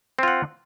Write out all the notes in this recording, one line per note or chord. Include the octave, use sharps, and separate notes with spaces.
C4 F4 F#5